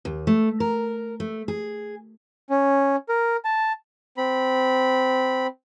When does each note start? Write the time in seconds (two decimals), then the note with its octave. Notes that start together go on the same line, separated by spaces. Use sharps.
0.05 D#2
0.27 A3
0.60 A#4
1.20 A3
1.48 G#4
2.50 C#4
3.09 A#4
3.45 A5
4.17 C4 B5